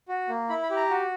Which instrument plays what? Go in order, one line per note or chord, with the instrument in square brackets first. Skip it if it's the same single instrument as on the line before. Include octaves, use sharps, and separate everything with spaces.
[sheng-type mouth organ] F#4
A#3
E4 B5
B5
G4
A#5
F#4